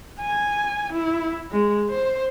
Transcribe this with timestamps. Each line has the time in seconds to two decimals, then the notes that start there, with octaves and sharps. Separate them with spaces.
0.20 G#5
0.93 E4
1.51 G#3
1.90 C5